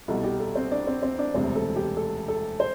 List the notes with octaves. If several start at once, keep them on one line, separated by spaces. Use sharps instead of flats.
C2 B2 G3 A4
G4
A4
C4 C5
D4 D5
C4 C5
C4 C5
D4 D5
E1 D2 C3 G3 C4 C5
A4
G4
A4
A4
C5